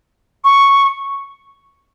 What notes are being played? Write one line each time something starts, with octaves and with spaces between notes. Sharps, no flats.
C#6